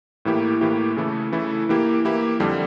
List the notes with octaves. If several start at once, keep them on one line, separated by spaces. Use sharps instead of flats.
A2 E3 A#3 E4 G4
A2 E3 A#3 E4 G4
C#3 E3 A3 E4 A4
C#3 E3 A3 E4 A4
E3 A#3 E4 G4
E3 A#3 E4 G4
F2 D3 G3